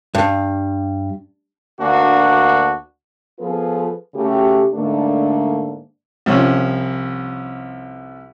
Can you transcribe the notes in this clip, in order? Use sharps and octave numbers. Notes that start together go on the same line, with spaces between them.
G2
D2 A#3 D4 F#4
F3 B3 F4 G#4 A4 B4
C#3 A3 F#4 G4
G#2 D3 A3 A#3 D4
C2 F3 C#4